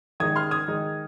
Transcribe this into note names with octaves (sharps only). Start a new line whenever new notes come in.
D#3 G#3 D#4 D#6 G#6
C6 F6
D#6 G#6
D#3 G#3 D#4